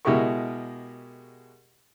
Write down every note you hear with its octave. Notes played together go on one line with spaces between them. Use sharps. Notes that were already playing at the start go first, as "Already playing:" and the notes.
B2 G#3 E4 G4 A#4 C#6